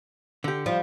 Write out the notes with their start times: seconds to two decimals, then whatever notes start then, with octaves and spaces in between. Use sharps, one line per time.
0.44 D3 G4
0.66 F3 G3 F4